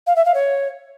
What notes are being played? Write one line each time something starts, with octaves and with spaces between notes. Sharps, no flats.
F5
E5
F5
C#5